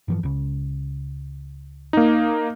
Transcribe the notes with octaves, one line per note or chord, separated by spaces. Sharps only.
G2 E3 F3
C#2 C#3
A#3 D#4